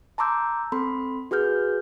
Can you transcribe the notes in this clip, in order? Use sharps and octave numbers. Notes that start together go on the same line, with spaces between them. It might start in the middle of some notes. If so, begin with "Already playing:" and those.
A5 A#5 C6 D6 E6 G6
C4 A4 B5 C6
F#4 G#4 B4 F6 G6